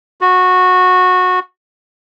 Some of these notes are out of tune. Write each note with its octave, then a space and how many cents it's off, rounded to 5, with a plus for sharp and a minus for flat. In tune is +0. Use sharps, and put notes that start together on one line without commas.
F#4 -15